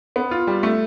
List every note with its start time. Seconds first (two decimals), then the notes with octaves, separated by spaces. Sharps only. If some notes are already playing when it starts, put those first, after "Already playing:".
0.16 B3
0.31 F4
0.47 G3
0.63 A3